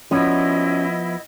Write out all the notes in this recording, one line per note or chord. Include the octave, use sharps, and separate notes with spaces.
F3 B3 C#4 E4 F#4 D5 D#5